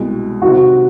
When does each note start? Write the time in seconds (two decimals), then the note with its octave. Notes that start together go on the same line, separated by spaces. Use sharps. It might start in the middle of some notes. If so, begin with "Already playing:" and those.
Already playing: C2 B2 G#3
0.42 C3 D#3 F#3 F#4